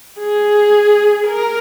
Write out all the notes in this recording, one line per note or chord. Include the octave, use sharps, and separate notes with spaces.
G#4
A#4